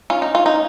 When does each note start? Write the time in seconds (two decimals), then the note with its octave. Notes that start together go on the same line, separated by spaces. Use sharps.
0.10 C#4 F4
0.22 D#4
0.34 C#4 F4
0.46 D#4